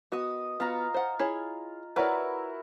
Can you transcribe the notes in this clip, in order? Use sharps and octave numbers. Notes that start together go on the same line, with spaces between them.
B3 F#4 D#5 D#6
B3 F4 F#4 F5 A#5
C5 F#5
E4 G#4 C#5
E4 F#4 A#4 B4 C#5 D5